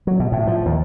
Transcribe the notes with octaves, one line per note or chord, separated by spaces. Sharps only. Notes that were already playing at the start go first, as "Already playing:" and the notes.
F#3
B2
A2
F3
D#2